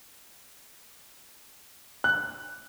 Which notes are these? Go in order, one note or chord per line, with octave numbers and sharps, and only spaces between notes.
F#6